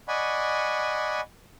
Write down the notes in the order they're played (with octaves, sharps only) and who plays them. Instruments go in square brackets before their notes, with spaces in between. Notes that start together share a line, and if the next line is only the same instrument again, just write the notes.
[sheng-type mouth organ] D5 D#5 F#5 G#5 B5 C#6